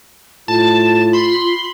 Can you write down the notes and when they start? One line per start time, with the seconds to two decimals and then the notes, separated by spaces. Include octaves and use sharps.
0.48 A2 F4 A5
1.13 B5 C6